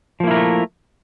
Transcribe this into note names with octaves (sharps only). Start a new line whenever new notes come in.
F3 A3 A#3 E4 A#4